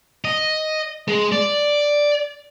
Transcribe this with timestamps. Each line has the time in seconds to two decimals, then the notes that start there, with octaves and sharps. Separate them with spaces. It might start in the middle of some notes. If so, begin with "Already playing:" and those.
0.25 D#5
1.08 G#3
1.32 D5